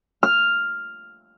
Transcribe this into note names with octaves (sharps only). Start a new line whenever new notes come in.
F6